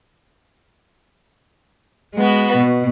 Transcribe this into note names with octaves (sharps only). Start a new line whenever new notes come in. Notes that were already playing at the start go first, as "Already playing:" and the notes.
G#3 B3 F#4
B2